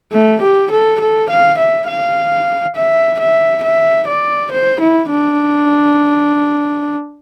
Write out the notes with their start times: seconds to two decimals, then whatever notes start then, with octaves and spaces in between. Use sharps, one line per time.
0.12 A3
0.41 G4
0.71 A4
1.00 A4
1.29 F5
1.58 E5
1.87 F5
2.76 E5
3.19 E5
3.64 E5
4.08 D5
4.51 C5
4.80 E4
5.10 D4